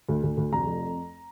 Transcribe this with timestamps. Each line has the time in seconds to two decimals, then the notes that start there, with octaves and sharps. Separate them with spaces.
0.09 D2
0.23 D2
0.37 D2
0.53 F1 A#5
0.67 F2